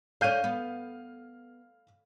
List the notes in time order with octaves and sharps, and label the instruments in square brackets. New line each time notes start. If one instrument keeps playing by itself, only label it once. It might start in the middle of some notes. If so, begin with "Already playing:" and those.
[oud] D3 C#4 [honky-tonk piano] F5 G6 D#7
[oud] B3